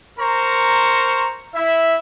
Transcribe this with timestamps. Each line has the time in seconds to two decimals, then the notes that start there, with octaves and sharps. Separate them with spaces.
0.19 A#4 C5 A#5 C#6
1.55 E4 E5